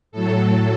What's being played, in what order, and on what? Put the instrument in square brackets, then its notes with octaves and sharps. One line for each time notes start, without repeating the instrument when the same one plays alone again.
[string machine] A2 F#3 A4